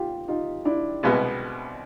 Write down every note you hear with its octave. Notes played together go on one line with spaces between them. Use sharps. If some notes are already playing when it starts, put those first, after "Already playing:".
Already playing: F4 G4
D#4 F4
D4 E4
C2 B2 G#3 B3